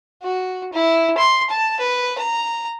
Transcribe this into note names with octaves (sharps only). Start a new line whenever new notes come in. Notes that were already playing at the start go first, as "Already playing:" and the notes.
F#4
E4
C6
A5
B4
A#5